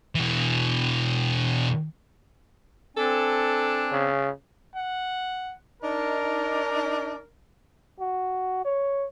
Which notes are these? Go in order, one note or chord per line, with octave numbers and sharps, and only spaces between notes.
B2 E3
C4 D4 A4 G#5
C#3
F#5
D4 D#4 A#4
F#4
C#5